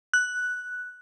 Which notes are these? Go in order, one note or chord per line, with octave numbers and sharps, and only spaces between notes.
F#6